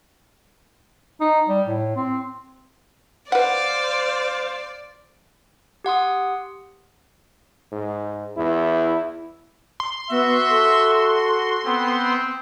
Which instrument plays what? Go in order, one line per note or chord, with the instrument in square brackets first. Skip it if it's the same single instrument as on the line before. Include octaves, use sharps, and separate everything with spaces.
[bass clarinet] D#4
G3
A2
C4
[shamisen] B4 F#5 [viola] C5 F5 [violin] D5
[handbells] G4 F#5 C6 D#6
[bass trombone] G#2
[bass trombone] E2 [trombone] E4
[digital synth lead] C6
[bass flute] B3 [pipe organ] F#4 [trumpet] E5
[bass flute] A4
[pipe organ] B3 [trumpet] C4